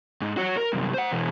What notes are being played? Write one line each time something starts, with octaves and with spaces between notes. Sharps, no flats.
G#2
F#4 C#5
A#4
C2 F#2
C5 F#5
B2 E3